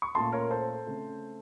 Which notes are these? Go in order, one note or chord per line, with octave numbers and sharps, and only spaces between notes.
C#6
A#2 A3 C#4 A5 C6
A#4 C#5
A4 C5
C#3 A3 C4